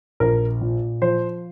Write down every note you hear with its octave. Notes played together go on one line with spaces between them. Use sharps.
A#1 A#4
A#2
F3 C5